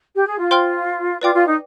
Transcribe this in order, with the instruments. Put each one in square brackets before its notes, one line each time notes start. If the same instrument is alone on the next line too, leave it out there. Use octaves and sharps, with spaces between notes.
[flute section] G4
G#4
F4
[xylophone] C5 G5 C6 F6
[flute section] F4 [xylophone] B4 D5 G5 D6
[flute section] F4
D#4